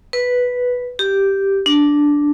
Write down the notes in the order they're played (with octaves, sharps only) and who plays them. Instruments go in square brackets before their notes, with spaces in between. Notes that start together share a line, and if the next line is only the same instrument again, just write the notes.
[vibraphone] B4
G4
D4